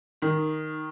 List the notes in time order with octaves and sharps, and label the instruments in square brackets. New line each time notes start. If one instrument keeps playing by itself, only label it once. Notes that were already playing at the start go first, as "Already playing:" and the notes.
[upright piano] D#3 [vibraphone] D#4
[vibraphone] D#4